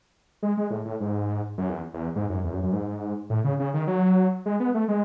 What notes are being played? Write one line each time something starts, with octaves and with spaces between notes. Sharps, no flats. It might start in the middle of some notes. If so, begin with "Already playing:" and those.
G#3
G#3
A2
A2
G#2
F#2
E2
E2
G#2
F#2
E2
F#2
F#2
G#2
A2
C#3
C#3
D#3
F#3
G#3
B3
A3
G#3